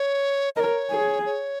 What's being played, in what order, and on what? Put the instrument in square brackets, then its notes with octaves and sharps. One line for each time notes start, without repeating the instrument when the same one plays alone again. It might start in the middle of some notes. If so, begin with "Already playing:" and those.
Already playing: [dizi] C#5
[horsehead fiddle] A#4 [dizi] C#5 D#5
[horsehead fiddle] G#4
[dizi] C#5